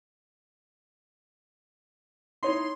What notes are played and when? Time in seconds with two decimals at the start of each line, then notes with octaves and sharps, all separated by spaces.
2.43 D#4 E4 C#5 C6